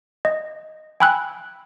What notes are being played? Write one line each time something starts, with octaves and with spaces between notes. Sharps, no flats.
D#5
G5 G#5 B5 E6 F#6